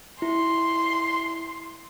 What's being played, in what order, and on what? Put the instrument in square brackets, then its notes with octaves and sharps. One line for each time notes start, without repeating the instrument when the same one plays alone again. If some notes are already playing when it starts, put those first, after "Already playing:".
[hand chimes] E4 [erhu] C6